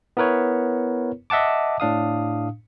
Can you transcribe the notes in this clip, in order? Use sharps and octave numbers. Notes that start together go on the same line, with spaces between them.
B3 E4 A#4 B4 C#5
D#5 E5 F#5 A5 D6
A2 D4 F5 D#6